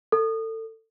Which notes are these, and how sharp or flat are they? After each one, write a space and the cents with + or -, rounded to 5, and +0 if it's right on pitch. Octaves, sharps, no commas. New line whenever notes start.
A4 +25